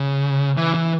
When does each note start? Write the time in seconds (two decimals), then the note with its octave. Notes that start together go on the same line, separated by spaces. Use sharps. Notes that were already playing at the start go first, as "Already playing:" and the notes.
Already playing: C#3
0.57 E3
0.75 E3